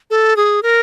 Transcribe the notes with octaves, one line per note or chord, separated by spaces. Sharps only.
A4
G#4
A#4